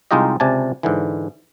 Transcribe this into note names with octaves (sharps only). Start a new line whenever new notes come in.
C2 G#3 D#4 F4 G4 D#5
C#2 C3 D5 G#5 A5
G#2 D3 E3